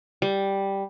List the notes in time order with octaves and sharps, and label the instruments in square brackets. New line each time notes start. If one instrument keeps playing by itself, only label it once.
[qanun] G3